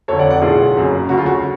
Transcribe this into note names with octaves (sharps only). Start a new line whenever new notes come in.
F1 F2 D3 A4 C#5
D5 F#5
D5 F#5
B1 A2 F4 G#4
F#1 F#2 C#3
D2 C#3 F#4
F4
F#4